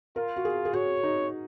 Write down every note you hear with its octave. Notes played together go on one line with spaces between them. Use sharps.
F4 A#4
F#4
G#4
G#4
F#4 C#5
D#4